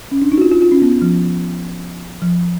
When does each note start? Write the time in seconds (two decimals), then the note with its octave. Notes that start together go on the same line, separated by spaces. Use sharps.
0.12 C#4
0.22 D4
0.32 D#4
0.38 F#4
0.42 F4
0.52 F4
0.62 F4
0.72 C#4
0.82 B3
1.02 F3
2.22 F3